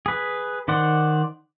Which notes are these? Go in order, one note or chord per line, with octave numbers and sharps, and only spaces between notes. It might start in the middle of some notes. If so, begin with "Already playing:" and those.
G#4 B4
D#3 C5 D5 F#5